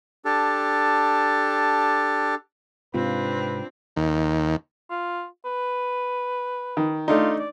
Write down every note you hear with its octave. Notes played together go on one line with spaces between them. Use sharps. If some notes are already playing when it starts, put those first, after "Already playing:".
D4 G4 A4
G#2 C3 C4 D4 F4 B4
D#2
F4
B4
D#3
A3 D4 D#4 F4
D5